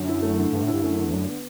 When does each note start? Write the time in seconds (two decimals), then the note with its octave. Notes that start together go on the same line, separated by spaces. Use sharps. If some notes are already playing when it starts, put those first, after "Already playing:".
Already playing: F#2 D3
0.08 E4
0.22 A3
0.38 D3
0.52 G2 D3
0.62 A2
0.68 E4
0.73 G2
0.83 F#2 A3
0.97 D3
1.05 E2
1.13 F#2 D4
1.28 B3